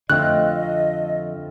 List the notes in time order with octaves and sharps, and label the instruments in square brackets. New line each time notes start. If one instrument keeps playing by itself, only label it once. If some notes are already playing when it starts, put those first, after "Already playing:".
[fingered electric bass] F2 D3 [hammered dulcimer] A3 C4 F4 [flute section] D#5 [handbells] F#6